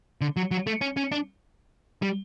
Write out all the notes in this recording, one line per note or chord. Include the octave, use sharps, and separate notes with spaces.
D3
F#3
F#3
A3
C#4
C#4
D4
G3